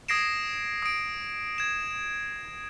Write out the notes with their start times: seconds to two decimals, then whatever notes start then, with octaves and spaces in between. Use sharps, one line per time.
0.08 D#6 G#6 A#6 C7 D7 E7
0.82 D#6 D7
1.58 G#6 E7